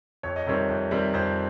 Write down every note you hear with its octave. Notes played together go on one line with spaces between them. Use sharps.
F2 C#5
D#5
C3 D#3 G3 C4 C#5
F2
C3 D#3 G3 C4
F2 C5